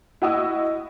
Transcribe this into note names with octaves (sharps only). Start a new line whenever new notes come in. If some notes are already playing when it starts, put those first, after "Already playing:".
E4 F#4 D#5 E6